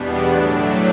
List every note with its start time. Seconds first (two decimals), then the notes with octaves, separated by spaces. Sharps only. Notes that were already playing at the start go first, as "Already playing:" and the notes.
Already playing: E2 B2 G3 B3 D4
0.24 A2 F#3 A3 D4